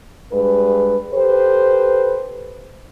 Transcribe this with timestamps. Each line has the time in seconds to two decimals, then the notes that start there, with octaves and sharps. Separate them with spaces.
0.32 G2 G#3 B4
1.13 G4 A4 B4 C5